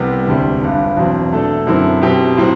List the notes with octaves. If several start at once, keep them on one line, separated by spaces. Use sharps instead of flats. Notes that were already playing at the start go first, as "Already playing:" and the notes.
Already playing: C2 C3 G3 B3
E1 D2 D3 G3 C4
G1 G2 D3
E2 B2 F#3 C4
B2 A3 D4 A4
F#2 D3 F#3 C4 E4
B2 F#3 C4 G4
A2 F#3 C4